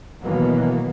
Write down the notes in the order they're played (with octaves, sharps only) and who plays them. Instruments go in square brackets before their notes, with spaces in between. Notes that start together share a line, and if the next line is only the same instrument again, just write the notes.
[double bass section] B2 D#3 E3 F#3 A#3 B3